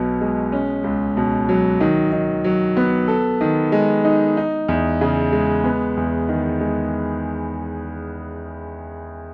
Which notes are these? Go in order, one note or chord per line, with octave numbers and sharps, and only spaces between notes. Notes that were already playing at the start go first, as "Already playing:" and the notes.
Already playing: B1 B2 B3
G#3
C#4
C#2
B2
F#3
D#3
D#3
F#3
B3
A4
D#3
G#3
D#4
D#4
E2
C#3
G#3
B3
E2
D#3
G#3